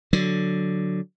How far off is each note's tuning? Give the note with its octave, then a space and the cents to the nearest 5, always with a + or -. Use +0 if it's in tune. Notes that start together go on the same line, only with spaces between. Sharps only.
D3 +0 F#3 +0